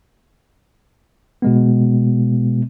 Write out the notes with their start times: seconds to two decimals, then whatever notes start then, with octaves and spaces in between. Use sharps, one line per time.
1.42 B2 G#3 B3